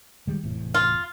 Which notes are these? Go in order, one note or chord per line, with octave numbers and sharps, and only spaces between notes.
D#3 G3 G#3
F1 E2 A2
F4